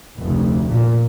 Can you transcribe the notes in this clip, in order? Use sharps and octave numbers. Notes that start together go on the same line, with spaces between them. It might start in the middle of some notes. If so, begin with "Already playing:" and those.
F1 D2
A#2